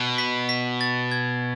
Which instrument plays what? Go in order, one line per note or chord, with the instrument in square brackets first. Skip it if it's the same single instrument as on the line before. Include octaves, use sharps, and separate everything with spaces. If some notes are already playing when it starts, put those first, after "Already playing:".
Already playing: [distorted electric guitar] B2
[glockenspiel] B6
B6
A6
G#6